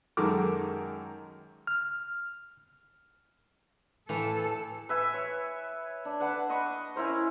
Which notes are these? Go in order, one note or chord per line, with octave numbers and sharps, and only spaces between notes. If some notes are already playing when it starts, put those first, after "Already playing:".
F#2 D#3 G#3 A4 A#4 D6
F6
A2 E3 A4 F5
B4 E5 G#5
C#5
D4
D4 B4 F#5 A5
D#5 B5 C#6
C#4 E4 A#4 C5